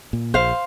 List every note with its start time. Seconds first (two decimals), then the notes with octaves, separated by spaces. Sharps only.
0.13 A#2
0.34 A#1 C5 F5